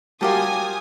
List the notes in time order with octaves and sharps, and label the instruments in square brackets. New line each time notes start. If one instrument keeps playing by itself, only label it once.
[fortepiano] F#3 G3 A#4 [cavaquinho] F4 G4 A5 [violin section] G#5 D#6